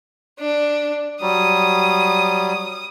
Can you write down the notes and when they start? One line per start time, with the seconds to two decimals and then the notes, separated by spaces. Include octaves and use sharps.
0.39 D4
1.21 F#3 G3 D#6